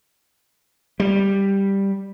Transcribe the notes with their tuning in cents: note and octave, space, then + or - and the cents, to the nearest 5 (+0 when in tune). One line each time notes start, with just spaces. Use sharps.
G3 +5